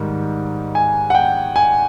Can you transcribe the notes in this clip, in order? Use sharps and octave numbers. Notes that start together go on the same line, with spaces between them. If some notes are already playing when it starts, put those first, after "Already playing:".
Already playing: G#2 D#3 G3
G#5
F#5
G5
G#5